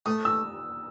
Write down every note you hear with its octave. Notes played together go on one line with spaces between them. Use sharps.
A3 D#6
E6